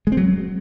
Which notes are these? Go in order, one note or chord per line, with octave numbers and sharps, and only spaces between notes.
G#3
C4
F#3